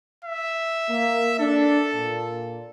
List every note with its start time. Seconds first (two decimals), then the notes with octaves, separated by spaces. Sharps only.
0.24 E5
0.89 A#3
1.39 D4 A4
1.94 A#2